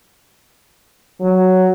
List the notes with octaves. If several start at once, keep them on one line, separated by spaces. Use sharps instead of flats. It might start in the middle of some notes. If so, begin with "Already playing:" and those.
F#3